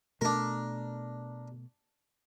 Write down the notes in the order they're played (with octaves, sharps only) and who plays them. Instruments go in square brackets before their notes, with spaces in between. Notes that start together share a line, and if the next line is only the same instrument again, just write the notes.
[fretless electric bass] B2 A3 [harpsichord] D4 A#4